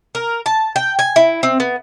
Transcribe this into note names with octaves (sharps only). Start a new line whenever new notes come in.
A#4
A5
G5
G#5
E4
C4
B3